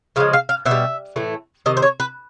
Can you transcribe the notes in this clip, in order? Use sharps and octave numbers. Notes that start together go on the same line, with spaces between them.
C#3 F3 G#3 F5
F5
F5
B2 E5
G3
A2 E3 A3
C3 D#3 D#5
C5
C#5
B4